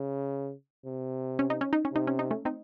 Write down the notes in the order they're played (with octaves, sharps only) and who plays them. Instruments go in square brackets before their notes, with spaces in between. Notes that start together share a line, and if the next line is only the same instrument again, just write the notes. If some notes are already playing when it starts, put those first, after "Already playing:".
Already playing: [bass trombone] C#3
C3
[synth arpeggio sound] C#4
D#4
C#4
D#4
C#4
[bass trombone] C3 [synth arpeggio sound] D#4
[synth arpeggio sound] C#4
D#4
A3 C#4
C4 D#4